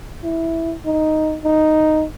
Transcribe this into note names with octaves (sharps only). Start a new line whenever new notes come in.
E4
D#4
D#4